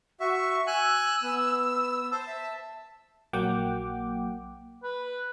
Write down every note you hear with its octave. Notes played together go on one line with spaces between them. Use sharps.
F#4 E5 C#6
G#5 E6 F#6
B3
C5 A5
E5
A#1 F#3 A#3 F#5 G5 D6
B4